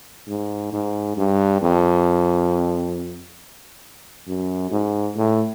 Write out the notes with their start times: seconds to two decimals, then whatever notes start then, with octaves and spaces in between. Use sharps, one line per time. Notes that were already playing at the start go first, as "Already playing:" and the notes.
0.28 G#2
0.73 G#2
1.17 G2
1.62 F2
4.28 F#2
4.71 G#2
5.16 A2